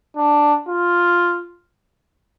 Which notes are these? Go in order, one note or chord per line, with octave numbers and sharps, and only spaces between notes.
D4
F4